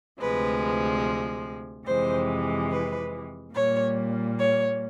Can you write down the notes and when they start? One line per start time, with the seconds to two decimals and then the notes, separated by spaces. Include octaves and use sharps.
0.19 D2 C3 F3 G#3 B4
1.86 F2 C3 E3 G#3 C5
2.70 B4
3.53 A#2 G3 A#3 C#5
4.37 C#5